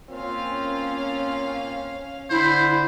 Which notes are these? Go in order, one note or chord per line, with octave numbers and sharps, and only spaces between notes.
A#3 C4 C#4 F4 F5
D3 E4 C5